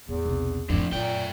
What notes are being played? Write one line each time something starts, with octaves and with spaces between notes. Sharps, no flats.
E2 A2
B1 C3
F2 A2 F3 D4
F#2 A#2 A3 G5